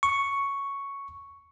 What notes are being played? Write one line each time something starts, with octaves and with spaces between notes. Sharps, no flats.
C#6